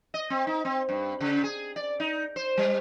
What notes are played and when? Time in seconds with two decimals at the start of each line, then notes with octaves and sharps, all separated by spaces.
0.14 D#5
0.30 C4
0.47 D#4
0.65 C4
0.89 G2
1.20 C#3
1.44 G#4
1.76 D5
2.00 D#4
2.36 C5
2.57 G3